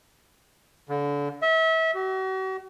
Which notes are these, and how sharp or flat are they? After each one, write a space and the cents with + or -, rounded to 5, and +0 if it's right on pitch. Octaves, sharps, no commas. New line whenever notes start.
D3 -30
E5 -30
F#4 +40